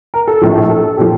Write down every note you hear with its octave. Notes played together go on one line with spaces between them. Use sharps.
A#4
A4
A#1 A2 F3
A4
A4
A#2 F3 G4